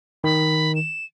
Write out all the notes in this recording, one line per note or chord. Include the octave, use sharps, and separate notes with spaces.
D#3 B5
E7